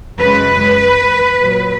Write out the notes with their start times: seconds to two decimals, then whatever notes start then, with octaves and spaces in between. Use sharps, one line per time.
0.20 F#2 C#3 G#3 B4
1.38 A#2 F#3